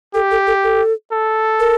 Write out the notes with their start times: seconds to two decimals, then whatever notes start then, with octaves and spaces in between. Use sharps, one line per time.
0.14 G4 A4
0.31 A4
0.47 A4
0.64 A4
1.12 A4
1.60 A#4